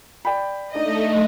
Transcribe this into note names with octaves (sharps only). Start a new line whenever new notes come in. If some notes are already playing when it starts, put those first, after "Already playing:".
D5 G5 B5
A3 D4 D#4 D5 D#5